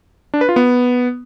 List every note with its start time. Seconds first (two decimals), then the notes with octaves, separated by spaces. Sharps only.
0.34 D4
0.41 B4
0.49 F4
0.56 B3